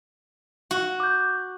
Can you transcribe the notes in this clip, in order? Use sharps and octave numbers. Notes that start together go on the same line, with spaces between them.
F#4
D6 G6